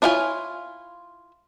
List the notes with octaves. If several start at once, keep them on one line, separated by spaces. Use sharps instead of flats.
D4 E4 F4 C#5 G#5